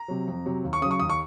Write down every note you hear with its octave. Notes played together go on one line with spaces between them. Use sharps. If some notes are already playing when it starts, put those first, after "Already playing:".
Already playing: A#5
C3 F#3
F2
C3 F#3
D#2
C#6
C#3 F#3 D#6
C#6
D#2 D#6
C#6